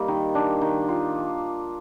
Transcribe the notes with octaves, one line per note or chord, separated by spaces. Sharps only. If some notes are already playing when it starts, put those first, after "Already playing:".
Already playing: G3 A#3 D#4
D#3
D4
D#3
F4